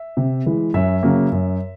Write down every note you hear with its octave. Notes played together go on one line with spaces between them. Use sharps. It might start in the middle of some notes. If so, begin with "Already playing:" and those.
Already playing: E5
C3
E3 G#3
F#2 E5
C#3 F#3 A#3 C#4
F#2